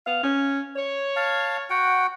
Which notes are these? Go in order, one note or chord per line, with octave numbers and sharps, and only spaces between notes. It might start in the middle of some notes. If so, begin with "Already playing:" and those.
B3 F5
C#4
C#5
F5 A5
F#4 F#5 G5